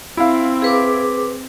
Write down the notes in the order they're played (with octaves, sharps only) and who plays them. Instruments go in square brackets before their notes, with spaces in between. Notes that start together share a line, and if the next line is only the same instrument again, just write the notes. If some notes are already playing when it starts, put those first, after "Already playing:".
[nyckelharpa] C4 [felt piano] E4 F5
[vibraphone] G#4 B4 D6